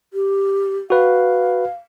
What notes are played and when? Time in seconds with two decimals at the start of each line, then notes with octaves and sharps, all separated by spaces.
0.13 G4
0.90 F#4 B4 F5